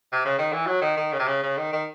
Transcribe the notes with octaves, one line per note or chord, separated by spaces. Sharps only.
C3
C#3
D#3
E3
F#3
D#3
D#3
C#3
C3
C#3
C#3
D#3
D#3